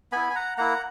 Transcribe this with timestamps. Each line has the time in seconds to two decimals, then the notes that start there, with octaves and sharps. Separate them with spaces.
0.12 B3 E4 G#5 B5
0.30 G#5
0.35 F#5 A#5
0.58 A#3 E4 F#5 A#5